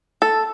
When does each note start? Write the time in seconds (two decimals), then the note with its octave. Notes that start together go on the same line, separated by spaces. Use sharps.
0.22 A4